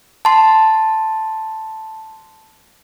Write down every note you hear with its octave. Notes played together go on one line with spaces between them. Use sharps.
A5 C6